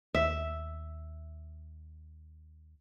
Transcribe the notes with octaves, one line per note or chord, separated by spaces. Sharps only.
D#2 E5